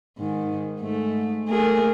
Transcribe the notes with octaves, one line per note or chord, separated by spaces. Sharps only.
G#2 D#3
G#2 A3
A3 G#4 A#4